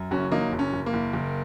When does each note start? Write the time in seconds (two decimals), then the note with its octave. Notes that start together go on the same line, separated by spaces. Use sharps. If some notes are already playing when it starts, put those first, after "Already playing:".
Already playing: F#2
0.11 F#1 C#4 F#4
0.32 F#3 A#3 D#4
0.52 F#1
0.59 C#4
0.73 F#1
0.86 A#3
0.93 F#1
1.13 F#1